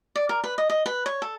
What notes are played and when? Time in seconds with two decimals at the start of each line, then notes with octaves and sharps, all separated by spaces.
0.15 D5
0.29 A#4
0.44 B4
0.58 D#5
0.70 D#5
0.86 B4
1.06 C#5
1.22 A4